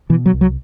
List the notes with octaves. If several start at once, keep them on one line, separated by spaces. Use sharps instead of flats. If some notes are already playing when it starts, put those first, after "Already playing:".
B2 E3
F#3
C2
F#3